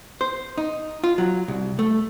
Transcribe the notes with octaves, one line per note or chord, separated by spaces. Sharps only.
C5
D#4
F4
F#3
C2
A3